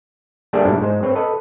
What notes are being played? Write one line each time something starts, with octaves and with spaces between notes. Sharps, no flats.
G3 A3 A#3 D4 G4 G#4
G#2 B2 G3 D4 E4
G#2 G#3 C5
C4 B4 C#5
A4 B4 D#5